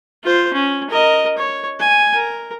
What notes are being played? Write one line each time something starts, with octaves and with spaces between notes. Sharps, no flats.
F4 C5
C#4
A#4 D#5
C#5
G#5
A#4